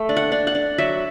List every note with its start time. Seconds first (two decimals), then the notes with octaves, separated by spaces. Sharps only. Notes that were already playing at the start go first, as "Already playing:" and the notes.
Already playing: A3
0.09 D4
0.17 F#5
0.32 D4
0.47 F#5
0.55 D4
0.78 F#3 E5